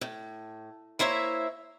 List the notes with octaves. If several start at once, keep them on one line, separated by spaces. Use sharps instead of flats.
A2
A#3 E4 C5 C#5 E5